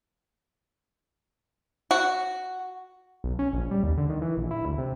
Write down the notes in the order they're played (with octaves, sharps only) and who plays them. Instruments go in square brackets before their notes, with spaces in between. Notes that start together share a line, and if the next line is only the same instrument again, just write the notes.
[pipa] F#4
[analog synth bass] B1
C#4
A#1
G3
D#2
D3
D#3
E3
A#1
E4
D2
C3